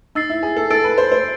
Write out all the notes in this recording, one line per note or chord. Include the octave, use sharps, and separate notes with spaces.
D#4 E6 A6 C7
E4
G#4
A4
A4 E6 A6 D7
B4
C5
C5